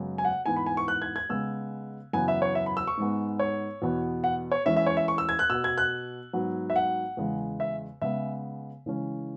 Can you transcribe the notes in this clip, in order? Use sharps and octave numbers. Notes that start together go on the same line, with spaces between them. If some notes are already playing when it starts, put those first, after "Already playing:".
Already playing: F#2 C#3 G#3 B3
G#5
F#5
G#2 E3 B3 G#5
B5
G#5
C#6
F#6
G#6
G#6
C#3 G#3 B3 E6
F#2 C#3 E3 B3 G#5
E5
C#5
E5
B5
E6
C#6
G#2 G#3 B3
C#5
E2 B2 B3
F#5
C#5
E2 E3 G#3 C#4 E5
E5
C#5
E5
C#6
E6
G#6
F#6
B2 B3 E6
G#6
F#6
G#2 F#3 B3
E5
F#5
E2 C#3 G#3
E5
C#3 G#3 B3 E5
C#3 E3 G#3 C#4